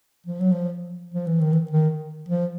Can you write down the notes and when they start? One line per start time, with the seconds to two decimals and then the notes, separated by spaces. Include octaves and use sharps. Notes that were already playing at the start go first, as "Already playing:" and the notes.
0.27 F3
0.40 F#3
0.52 F3
1.14 F3
1.27 E3
1.40 D#3
1.53 E3
1.71 D#3
2.29 F3